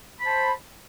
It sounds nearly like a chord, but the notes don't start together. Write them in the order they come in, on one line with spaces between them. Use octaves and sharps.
B5 C5 A5